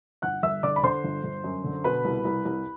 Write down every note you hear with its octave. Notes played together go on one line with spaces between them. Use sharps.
G1 F#5 F#6
G1 E5 E6
D3 D5 D6
B5
D3 C5 C6
G1
G1
F#2
D3
B2 B4 B5
C2
C2
C2